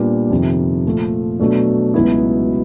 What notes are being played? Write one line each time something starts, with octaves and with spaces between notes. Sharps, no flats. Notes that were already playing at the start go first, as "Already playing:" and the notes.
Already playing: A#2 G3 B3 D4
F2 C3 D#3
A#2 F3 A3
B2 F#3 A3 D4
C#2 B2 F#3 B3 E4